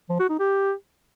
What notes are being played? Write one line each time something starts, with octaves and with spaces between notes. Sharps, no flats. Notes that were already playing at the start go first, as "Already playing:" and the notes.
F3
F#4
D#4
G4